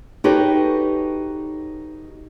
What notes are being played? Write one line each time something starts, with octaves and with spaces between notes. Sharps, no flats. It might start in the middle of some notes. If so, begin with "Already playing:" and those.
D#4 F#4 G4 A4 B4 C#5